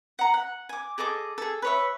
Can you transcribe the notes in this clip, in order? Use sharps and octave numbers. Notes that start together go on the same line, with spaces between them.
F#5 A#5
F#5
G#5 D6
G#4 A4 D#5 D6
G#4 A4
B4 C#5 E5